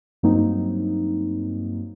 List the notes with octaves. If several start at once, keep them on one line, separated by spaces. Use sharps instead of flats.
G2 F#3 A#3 C4 D#4